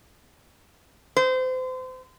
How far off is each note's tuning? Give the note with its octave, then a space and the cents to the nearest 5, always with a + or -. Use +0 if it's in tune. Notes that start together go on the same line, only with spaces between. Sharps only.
C5 -30